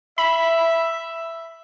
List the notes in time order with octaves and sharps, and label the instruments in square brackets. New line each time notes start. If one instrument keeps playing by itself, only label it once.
[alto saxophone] E5 [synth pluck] B5